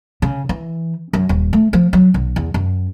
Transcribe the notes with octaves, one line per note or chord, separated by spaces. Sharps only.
C#3
E3
F#2
D#1
A3
F3
F#3
B1
E2
F#2